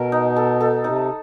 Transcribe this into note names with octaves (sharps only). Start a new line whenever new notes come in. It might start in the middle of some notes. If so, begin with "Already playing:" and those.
Already playing: B2 A4 A#4
D#4
A4
A4
C3 D#4